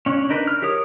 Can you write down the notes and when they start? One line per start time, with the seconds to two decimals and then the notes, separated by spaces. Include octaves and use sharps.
0.06 C#4 D4
0.29 D4 D#4 A#4 B4
0.47 F6
0.62 G4 A#4 C#5 D#6